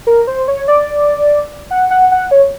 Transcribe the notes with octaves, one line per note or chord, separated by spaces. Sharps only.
A#4
C5
C#5
D5
F#5
F#5
F#5
C#5